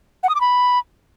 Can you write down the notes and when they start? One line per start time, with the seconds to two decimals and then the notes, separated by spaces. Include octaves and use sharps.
0.23 F#5
0.29 D#6
0.35 D6
0.41 B5